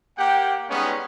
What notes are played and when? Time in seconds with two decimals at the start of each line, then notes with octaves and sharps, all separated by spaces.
0.18 A#3 G4 F#5 G5
0.70 G3 G#3 B3 C#4 D#4